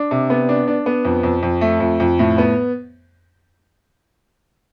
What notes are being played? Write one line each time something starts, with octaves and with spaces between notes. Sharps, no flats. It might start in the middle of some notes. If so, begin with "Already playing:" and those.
Already playing: D4
C3
B3
D4
D4
B3
F2
F2
F2
A3
F2
F2
A2
B3